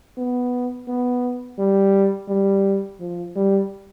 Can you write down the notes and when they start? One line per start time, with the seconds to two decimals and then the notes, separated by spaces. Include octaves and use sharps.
0.18 B3
0.88 B3
1.59 G3
2.29 G3
3.00 F3
3.36 G3